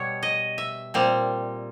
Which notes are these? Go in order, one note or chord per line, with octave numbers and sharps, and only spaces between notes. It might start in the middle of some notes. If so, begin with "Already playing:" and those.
Already playing: B2 G3 B3 C#5
D#5
E5
A#2 G3 C4